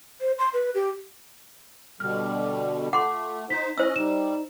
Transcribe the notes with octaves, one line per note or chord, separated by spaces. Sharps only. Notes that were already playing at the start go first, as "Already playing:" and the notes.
C5
C6
B4
G4
B2 D3 G3 F6
A3 F4 F#5 C6 D6
D#4 C5 B6
C#4 E4 C5 D#5 E6
G3 D#4 E7